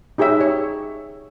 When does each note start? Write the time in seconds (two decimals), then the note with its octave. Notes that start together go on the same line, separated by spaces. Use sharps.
0.18 D#4 G4 G#4 C#5 E5
0.41 C#5